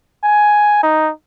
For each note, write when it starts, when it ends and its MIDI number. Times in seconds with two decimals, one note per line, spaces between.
0.24 0.82 80
0.83 1.11 63